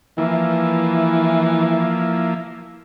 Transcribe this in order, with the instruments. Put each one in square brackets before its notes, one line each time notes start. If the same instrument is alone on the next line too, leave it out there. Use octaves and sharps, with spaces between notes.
[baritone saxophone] E3 [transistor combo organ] F3 A#3 E4